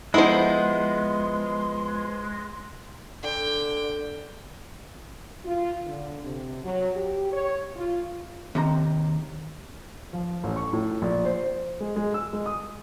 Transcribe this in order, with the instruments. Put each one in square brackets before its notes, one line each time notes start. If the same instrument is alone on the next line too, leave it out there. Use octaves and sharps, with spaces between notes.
[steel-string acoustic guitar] F3 B3 D#5 [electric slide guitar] G#3 [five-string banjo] E4 C5 [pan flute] C6
[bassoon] D3 [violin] G5
[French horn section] F4
D3
C3
F#3
G4
C#5
F4
[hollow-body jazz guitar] D#2 C3 A#5
[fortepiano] F3
A1
C#6
A2
A#1
C5
C5
G#3
G#3
E6
G#3
D#6